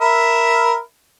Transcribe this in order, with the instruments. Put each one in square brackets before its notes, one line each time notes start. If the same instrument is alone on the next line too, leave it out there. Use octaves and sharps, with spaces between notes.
[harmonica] A#4 E5 B5